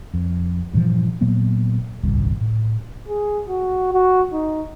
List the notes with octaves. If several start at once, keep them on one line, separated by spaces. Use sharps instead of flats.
F2
G2 A#2 E3 F3
A#2 F#3 A#3 B3
D#1 G#1 C#2 G3
A2
G#4
F#4
F#4
D#4